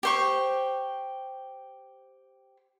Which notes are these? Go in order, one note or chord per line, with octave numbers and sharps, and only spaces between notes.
G4 C5 C#6